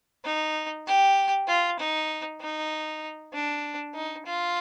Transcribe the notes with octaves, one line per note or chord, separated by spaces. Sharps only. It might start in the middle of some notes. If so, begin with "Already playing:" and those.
D#4
G4
F4
D#4
D#4
D4
D#4
F4